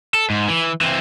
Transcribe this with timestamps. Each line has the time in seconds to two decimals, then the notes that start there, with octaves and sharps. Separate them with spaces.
0.14 A4
0.30 G#2
0.49 E3
0.81 E3 C4